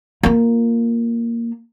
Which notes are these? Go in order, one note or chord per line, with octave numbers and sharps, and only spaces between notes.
A#3 F4